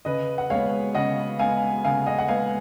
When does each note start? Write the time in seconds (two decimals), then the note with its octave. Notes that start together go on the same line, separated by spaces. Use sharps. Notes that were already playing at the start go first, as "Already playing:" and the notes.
0.05 C#3 B4 D#5
0.38 F#5
0.50 G#3 B3 C#5 F5
0.95 C#3 D#5 F#5
1.39 G#3 B3 F5 G#5
1.84 C#3 F5 G#5
2.06 D#5 F#5
2.19 F#5
2.28 G#3 B3 F5 G#5